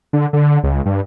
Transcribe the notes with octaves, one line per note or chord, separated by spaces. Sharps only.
D3
D3
C#2
G2